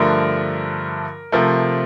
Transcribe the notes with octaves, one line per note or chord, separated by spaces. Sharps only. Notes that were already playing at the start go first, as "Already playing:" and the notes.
Already playing: G2 D3 F3 A3 A#4
C3 F3 A3 A#4